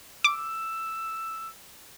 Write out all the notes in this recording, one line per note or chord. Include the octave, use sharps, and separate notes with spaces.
D6 E6